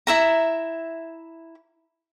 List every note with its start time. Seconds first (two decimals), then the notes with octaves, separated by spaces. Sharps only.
0.07 E4 E5 A#5